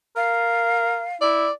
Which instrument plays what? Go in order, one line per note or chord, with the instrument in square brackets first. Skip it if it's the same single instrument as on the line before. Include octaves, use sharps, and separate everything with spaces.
[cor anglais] A#4 [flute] F5
[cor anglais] E4 [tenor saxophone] D5